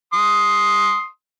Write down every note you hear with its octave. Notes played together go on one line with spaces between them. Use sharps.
C6 D#6